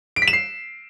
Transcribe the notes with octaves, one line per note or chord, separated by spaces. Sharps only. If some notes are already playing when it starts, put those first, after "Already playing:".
D7
B6
E7
C7